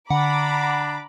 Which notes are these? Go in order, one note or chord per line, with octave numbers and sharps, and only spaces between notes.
D3 D4 F#5 A#5 B5 D6